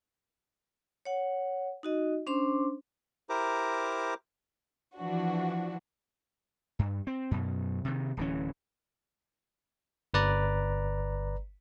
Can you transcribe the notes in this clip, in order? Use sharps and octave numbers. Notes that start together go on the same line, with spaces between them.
C#5 F#5
D#4 F#4 D#5
C#4 D4 C5 C6 D6
E4 G4 A#4 C5 A#5 D6
E3 F3 D4 F#4
G2
C4
F#2 B2
C3 D#3
D1 E3 C#4
G1 B4 D5 A#5